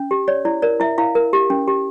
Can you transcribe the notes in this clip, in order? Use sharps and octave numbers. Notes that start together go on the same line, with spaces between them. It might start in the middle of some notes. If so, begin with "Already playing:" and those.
Already playing: C#4
G4
C#5 D5
E4 D5
A#4 D5
E4 E5
E4 F5
A#4
G4
C#4
G4